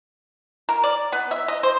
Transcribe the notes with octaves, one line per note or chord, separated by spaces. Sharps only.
A#4
D5
B3
E5
D#5
C5